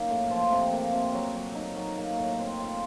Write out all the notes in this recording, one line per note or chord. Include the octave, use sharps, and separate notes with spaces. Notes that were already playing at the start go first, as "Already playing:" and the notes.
Already playing: F#2 A#3 D#4
A2
F3
C3
A#3
C3
F#3
F#3
D#4
F#3
A#3
A2
C4
F4